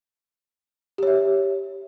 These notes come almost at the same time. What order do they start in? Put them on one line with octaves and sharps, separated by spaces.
G4 C#5 E5